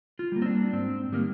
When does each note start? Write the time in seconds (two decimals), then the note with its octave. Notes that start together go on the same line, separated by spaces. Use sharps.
0.19 F4
0.32 G3 A#3
0.42 C4
0.46 D4
0.73 G#2 C4
1.12 D#3 G3 A#3